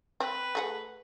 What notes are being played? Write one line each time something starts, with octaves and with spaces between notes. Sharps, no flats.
C4 B4
A3 G#4 F#5